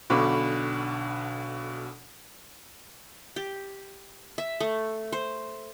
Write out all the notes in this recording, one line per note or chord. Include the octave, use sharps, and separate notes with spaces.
B1 B2 D3 B5 C#6 D6
G4
E5
A3
C5